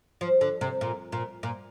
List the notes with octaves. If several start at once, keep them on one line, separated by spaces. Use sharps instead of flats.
F3
D3
C3
A#2
A#2
A#2